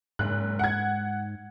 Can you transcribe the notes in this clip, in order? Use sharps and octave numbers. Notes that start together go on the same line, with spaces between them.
F#1 G#2 F#6
F#5 G#6